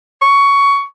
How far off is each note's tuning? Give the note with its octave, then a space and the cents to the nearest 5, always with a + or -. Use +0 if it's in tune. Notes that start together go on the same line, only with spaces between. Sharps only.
C#6 +15